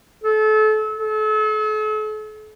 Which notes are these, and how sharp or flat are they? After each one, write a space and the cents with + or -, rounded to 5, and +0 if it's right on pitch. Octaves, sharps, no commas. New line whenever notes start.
A4 -30
A4 -40